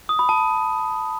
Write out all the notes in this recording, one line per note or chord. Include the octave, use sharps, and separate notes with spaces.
D#6
B5
A5